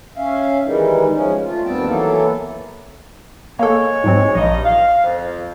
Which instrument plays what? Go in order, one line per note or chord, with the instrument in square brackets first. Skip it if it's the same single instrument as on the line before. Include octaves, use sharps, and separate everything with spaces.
[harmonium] C#4 E5 F5
D#3 E3 G3 G#3 D#4
F3 G#3 C#4
A3 F4
D#2 G3 B3 C4 G5 A5
E3 F#3 A#3 B3 A4
[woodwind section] G#3 C#5 [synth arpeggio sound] A#3 A4
[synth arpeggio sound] G#2 F#3 C4
[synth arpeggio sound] A#1 [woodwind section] G2 D#4 D#5
[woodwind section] F5
F2